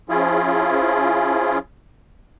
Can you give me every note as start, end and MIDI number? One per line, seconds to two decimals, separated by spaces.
0.09 1.58 53
0.09 1.58 61
0.09 1.58 64
0.09 1.58 65
0.09 1.58 68